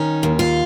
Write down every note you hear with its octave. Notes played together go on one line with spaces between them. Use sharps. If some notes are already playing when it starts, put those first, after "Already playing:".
Already playing: D#3 C#4
D#2
F4